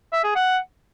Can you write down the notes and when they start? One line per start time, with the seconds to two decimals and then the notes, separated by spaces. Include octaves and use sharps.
0.13 E5
0.24 G#4
0.35 F#5